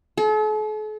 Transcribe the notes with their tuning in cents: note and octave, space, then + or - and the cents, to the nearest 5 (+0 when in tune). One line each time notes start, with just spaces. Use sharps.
A4 -45